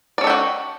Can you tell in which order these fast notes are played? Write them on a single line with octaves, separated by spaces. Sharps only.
D5 C#4 A4 G4 F#4